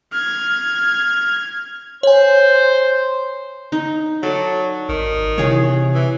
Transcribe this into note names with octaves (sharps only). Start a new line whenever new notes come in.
F6 G#6
C5 C#5 G#5
D#4
F#3 A4 D5
G#1 D#3
C3 E3 G#4 C#5
E3